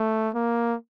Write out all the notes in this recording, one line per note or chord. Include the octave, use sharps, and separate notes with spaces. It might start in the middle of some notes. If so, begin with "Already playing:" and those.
Already playing: A3
A#3